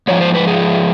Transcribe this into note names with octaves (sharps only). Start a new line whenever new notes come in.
G#2 F3 C#5
C5
B4
G#4